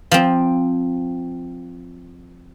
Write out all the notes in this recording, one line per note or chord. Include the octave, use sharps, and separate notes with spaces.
F3 C4